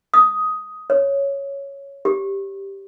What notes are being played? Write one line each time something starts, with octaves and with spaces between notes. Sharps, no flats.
D#6
C#5
G4